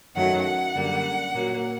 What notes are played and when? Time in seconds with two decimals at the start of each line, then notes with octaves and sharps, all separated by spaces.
0.15 F#2 D#3 F#3 A3 F#5
0.45 F#5
0.75 F#2 D3 G3 A#3
1.35 A#2 F#3 A#3